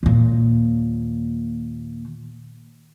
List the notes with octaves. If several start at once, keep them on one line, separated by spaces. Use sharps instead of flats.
D#2 A#2